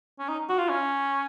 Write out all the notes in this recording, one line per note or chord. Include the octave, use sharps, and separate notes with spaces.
C#4
D#4
F#4
F4
C#4